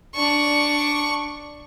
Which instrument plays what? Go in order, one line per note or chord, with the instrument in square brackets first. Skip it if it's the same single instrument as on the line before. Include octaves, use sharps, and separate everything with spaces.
[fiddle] D4 C#6